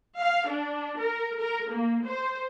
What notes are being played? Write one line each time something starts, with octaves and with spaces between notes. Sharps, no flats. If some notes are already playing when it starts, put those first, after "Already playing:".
F5
D4
A#4
A#4
A#3
C5